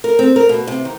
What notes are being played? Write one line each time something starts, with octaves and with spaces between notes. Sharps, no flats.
A#4
C4
A#4
B2
C3
D#3